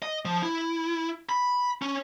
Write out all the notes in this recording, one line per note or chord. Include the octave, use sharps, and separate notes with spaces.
D#5
F3
E4
B5
C#4